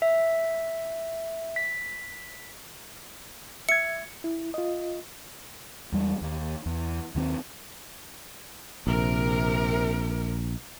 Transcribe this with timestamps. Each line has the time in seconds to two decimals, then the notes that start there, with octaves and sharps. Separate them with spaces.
0.02 E5
1.56 B6
3.69 E5 G#6 C#7
4.24 E4
4.54 F4 D#5
5.92 E2 G3 G#3
6.21 D#2
6.66 E2
7.15 D#2 D#3 B3 C4
8.87 A#1 C3 A#4